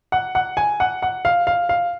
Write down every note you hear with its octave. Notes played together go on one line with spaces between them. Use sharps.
F#5
F#5
G#5
F#5
F#5
F5
F5
F5